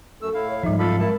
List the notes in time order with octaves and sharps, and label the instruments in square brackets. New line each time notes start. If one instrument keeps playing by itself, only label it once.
[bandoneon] F#2 A3 E6 [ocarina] A4
[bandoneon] A2 E4 F5
[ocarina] C#5
[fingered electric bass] G#2 F3 [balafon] G3 D#4 [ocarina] E5
[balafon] F#3 C4 [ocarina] F4 [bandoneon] A4 F5 B5
[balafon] G#3 [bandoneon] E4 A5 [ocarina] A#4